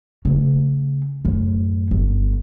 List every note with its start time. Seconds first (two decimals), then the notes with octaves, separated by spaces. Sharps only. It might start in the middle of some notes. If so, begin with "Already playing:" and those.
0.25 C#3 A3
1.25 F#2 A2
1.91 G1